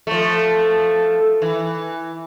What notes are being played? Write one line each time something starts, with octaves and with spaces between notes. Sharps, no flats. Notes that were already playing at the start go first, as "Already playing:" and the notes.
F3 A3
E3